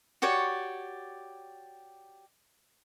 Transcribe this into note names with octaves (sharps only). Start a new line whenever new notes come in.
F#4 G4 C#5 D5